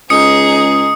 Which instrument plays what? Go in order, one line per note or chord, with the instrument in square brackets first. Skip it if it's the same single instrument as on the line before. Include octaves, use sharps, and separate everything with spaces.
[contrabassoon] C#2 [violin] D#4 G#4 [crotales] D#6 C#7